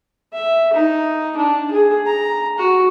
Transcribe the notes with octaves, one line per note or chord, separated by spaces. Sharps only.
E5
D#4
D4
G#4
A#5
F#4